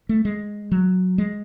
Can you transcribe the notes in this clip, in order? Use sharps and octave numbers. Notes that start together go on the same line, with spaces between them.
A3
G#3
F#3
G#3